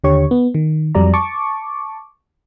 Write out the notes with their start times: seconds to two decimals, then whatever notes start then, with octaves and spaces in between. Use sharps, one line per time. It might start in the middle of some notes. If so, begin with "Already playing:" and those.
0.04 D#2 D3 G4 C#5 C#6
0.31 B3
0.55 D#3
0.95 F2 F#3 G3 D5 A#5
1.13 A5 C#6 D6